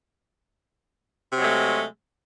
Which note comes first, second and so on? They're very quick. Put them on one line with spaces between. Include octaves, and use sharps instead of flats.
C3 F#3 G#3 A3